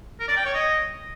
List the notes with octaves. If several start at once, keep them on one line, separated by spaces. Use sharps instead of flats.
A#4
D5
G5
C#5
D#5